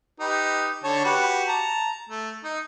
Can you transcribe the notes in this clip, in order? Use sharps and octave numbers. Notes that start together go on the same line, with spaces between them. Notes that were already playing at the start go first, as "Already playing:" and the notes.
D#4 G4 B4
D3 C#5 A5
F#4 G4 B4
A5 A#5
A3
D#4